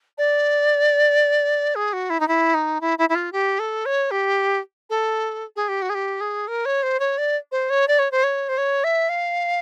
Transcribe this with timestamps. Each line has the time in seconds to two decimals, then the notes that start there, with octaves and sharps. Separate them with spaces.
0.18 D5
1.75 G#4
1.93 F#4
2.10 E4
2.20 D#4
2.28 E4
2.54 D#4
2.81 E4
2.98 E4
3.09 E4
3.15 F4
3.32 G4
3.59 A4
3.86 C#5
4.11 G4
4.90 A4
5.56 G#4
5.68 G4
5.82 F#4
5.89 G#4
5.94 G4
6.20 G#4
6.48 A#4
6.65 C#5
6.83 C5
7.00 C#5
7.18 D5
7.52 C5
7.70 C#5
7.88 D5
7.99 C#5
8.11 C5
8.23 C#5
8.49 C5
8.58 C#5
8.84 E5
9.09 F5